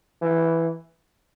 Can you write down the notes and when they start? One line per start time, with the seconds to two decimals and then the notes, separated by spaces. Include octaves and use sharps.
0.22 E3